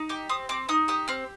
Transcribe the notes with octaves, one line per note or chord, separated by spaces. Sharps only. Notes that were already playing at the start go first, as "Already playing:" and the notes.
Already playing: D#4
G4 D6
C4 D#6
C4 D6
D#4 D#6
G4 D#6
C4 F6